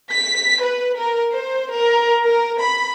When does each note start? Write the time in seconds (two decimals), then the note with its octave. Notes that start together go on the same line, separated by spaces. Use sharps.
0.10 B6
0.63 B4
0.97 A#4
1.34 C5
1.73 A#4
2.27 A#4
2.62 B5